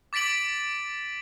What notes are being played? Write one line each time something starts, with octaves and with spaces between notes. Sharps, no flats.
D6 A6 B6 D7 F#7